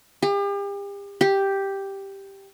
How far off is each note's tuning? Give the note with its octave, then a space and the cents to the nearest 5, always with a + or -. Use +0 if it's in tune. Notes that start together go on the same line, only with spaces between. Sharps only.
G4 +40
G4 +0